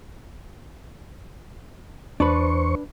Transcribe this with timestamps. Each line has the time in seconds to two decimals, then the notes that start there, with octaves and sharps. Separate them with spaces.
2.20 E2 D4 B4 C5 C#6